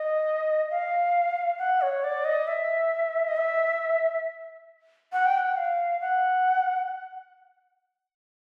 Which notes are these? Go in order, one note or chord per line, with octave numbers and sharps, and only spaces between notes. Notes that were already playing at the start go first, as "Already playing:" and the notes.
Already playing: D#5
F5
F#5
C#5
D5
D#5
E5
D#5
E5
F#5
G5
F#5
F5
F#5